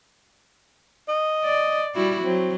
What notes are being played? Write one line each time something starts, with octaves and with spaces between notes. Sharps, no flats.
D#5
D5
G3 E4 F#4
F#3 C4